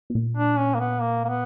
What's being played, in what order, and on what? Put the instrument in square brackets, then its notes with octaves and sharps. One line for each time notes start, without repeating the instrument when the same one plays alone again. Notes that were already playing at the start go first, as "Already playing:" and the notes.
[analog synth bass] B2
A#2
[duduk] D4
C#4
A#3
B3
A#3
A#3
B3